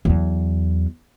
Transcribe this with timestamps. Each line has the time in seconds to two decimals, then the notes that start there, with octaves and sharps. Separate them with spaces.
0.05 E2 F#3